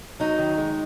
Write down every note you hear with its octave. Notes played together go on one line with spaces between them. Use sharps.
F#3 D#4
D#3
G#3